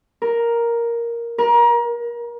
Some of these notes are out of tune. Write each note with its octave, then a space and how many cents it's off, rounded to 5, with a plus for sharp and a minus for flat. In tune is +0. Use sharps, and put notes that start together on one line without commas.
A#4 +5
A#4 +30